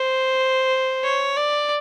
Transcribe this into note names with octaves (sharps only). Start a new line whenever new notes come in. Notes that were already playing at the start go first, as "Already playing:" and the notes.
Already playing: C5
C#5
D5